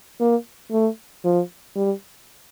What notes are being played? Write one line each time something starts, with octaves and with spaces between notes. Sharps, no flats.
A#3
A3
F3
G3